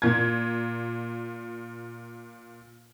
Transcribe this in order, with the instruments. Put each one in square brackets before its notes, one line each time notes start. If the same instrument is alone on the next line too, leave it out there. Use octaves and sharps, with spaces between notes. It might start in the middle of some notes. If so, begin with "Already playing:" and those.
[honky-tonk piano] A#2 G#6